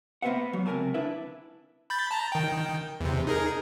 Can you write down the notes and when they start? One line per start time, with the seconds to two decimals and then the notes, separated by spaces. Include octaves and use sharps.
0.22 A#3 B3 B4 C5 E5 F#5
0.53 F#3
0.66 C#2 C3 C#4 A#4 G#5 A5
0.94 D2 D4 E4 B4 E5
1.90 B5 G6 A6
2.11 A5 A#5
2.32 D#3 G5
3.00 E2 C3
3.27 D#4 G#4 A#4